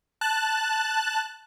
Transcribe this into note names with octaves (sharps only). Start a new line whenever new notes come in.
A5 F#6